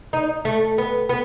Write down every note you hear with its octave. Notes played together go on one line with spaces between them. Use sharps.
D#4
A3
B3
B3